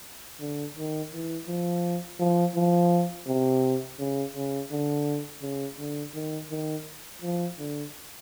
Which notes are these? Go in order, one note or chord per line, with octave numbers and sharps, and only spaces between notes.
D3
D#3
E3
F3
F3
F3
C3
C#3
C#3
D3
C#3
D3
D#3
D#3
F3
D3